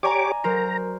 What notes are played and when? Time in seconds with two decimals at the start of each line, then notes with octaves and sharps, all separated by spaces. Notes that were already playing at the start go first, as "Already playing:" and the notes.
0.03 G4 C#5 D5 G#5 A#5 D6
0.44 F#3 A#4 C5 A#5